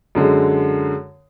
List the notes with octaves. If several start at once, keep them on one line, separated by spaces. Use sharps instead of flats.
F#2 D3 G#3